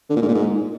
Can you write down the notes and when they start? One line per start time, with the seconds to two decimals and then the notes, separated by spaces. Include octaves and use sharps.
0.10 D3
0.16 A#2
0.22 G#2
0.28 A#2
0.34 G#2